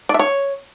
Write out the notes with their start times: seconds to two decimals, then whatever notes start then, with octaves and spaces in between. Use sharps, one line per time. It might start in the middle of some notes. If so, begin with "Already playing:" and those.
0.09 D5
0.14 E5
0.19 C#5